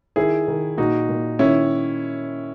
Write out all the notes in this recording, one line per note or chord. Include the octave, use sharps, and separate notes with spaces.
D#3 E4 G#4
D#3
A#2 D#4 F#4
A#2
D#3 C#4 E4